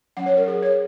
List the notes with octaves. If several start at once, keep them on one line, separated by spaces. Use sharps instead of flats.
F#3 C#4 F#5
C#5
A#4
G#4
C#5